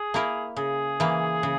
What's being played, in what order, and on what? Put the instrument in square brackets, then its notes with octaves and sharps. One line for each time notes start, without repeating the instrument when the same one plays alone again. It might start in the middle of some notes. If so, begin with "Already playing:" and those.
Already playing: [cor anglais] G#4
[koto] A#3 E4 A#4
[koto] C#3 [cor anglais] G#4
[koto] E3 A#3
C#3